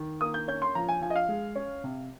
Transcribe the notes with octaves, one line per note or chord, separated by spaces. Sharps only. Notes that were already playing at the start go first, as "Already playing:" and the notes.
Already playing: D#3
A#3 D#6
G6
C#4 G6
C6
F3 A#5
G#5
F3 G#5
D#5
F5
G#3
C#4
C3